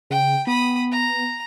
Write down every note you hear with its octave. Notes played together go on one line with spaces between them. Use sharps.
C#3 G5
B3 B5 D#6
A#5